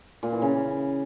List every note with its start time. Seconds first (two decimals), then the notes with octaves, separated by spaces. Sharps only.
0.23 A#2
0.32 E3
0.42 C#3